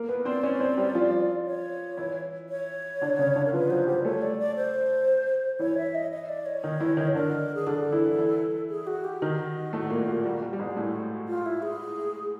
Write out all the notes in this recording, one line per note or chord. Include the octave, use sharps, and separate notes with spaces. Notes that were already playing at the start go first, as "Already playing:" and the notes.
Already playing: A#3 A#4
B3 B4
C4 C5 D5
C#4 C#5
C4 C5
G3 G4
F3 F4
C#5
E3 E4
C#5
D3 D4
C#3 C#4
D3 D4
A#4
F3 F4 B4
F#3 F#4 C5
G3 G4 C5
A3 A4 C#5
D5
D5
C5
E3 E4 C#5
E5
D#5
D#5
D5
C#5
D#3 D#4
E3 E4
D#3 D#4
D3 D4 A#4
G#4
D3 D4 A4
E3 E4
E3 E4
G#4
F#4
G4
D#3 D#4 F#4
A2 A3
A#2 A#3
A#2 A#3
G3
G3
G3
G#2 G#3
A2 A3
F4
E4
G#4